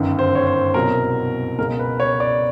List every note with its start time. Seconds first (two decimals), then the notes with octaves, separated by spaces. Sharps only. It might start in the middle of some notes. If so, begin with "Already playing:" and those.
Already playing: G1 F#2 D#3
0.19 C5
0.35 C#5
0.47 C5
0.74 C2 B2 F#3 A#4
1.58 C#2 B2 G#3 A#4
1.79 B4
2.00 C#5
2.20 D5